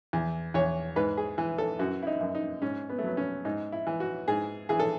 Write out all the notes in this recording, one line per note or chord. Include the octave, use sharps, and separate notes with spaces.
E2
E2 C#5
G#2 B4
G#4
E3
A4
F#2 F#4
E4
D#4
F#2
D#4
G#2 C#4
B3
A3
F#3 B3
C#4
G#2 D#4
E4
E3
F#4
G#2 G#4
E3 G#4
A4